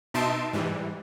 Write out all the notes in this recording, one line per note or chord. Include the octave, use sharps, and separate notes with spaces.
B2 D#4 E5 A5 C6 D7
G#2 E3 G3